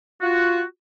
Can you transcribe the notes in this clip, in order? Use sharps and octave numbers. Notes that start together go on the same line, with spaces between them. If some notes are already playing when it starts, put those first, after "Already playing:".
F4 F#4